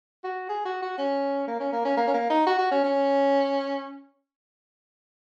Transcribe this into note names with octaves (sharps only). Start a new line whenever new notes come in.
F#4
G#4
F#4
F#4
C#4
A#3
C#4
A#3
C#4
A#3
C#4
A#3
D#4
F#4
F#4
C#4
C#4